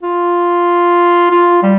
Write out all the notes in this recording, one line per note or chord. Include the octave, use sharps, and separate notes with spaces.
F4
F4
G3